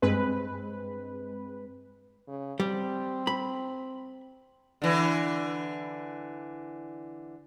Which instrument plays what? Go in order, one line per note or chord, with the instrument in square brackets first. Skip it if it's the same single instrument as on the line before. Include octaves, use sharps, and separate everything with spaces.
[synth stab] G2 G#3 C4 B4
[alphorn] C#3
[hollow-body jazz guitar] G3 [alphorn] C4
[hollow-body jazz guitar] B5
[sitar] D3 E3